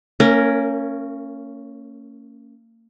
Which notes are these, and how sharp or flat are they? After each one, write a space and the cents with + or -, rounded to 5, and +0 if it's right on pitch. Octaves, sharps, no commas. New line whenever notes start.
A#3 -40 C#4 +0 A#4 +0